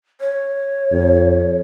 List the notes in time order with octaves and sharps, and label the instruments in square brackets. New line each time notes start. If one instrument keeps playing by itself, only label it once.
[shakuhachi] C#5
[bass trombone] F2